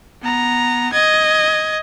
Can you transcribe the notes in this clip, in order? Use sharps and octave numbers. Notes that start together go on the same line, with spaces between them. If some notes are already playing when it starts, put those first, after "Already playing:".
B3 A#5
D#5 G#6